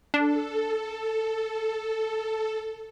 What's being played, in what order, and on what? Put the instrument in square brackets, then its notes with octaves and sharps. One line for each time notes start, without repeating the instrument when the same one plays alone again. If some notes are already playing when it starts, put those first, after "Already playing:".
[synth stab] D4 [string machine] A4